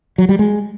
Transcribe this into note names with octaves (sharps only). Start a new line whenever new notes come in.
F#3
G3
G#3